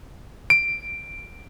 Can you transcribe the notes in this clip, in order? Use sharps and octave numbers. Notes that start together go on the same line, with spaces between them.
D7